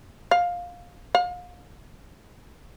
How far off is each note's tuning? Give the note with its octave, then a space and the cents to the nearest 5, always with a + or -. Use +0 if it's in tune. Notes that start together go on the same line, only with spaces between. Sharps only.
F5 +15
F5 +35